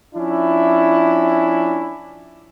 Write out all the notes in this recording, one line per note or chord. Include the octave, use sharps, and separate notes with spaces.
F3 C#4 D4 E4